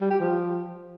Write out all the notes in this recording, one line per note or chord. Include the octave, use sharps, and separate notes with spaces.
G3
G4
F3